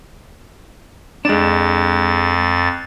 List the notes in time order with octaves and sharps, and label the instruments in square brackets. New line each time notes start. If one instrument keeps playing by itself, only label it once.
[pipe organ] F2 A6 [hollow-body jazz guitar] G#3 D4